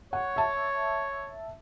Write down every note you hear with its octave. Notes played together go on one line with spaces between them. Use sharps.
C#5 F#5
E5 A5